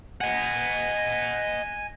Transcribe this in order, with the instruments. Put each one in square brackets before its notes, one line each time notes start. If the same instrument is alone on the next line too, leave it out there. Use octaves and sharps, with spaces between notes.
[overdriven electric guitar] D#5 F#5 [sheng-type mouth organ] G#5